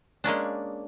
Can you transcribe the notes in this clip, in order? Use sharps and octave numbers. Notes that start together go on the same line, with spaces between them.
G#3 A#3 C#4 D4